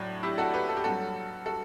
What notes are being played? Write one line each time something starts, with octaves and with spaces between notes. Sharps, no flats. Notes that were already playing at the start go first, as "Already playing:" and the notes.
Already playing: A2 F#3 D4
E4 G4
F#4 A4
G4 B4
A4
G4
G2 F#3 F#4 A4
F#4 A4